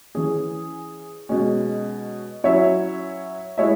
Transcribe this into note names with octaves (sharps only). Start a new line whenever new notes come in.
E3 C#4 G#4
B2 G#3 C#4
F#3 C#4 E4 C#5 E5
G#3 E4 C#5 E5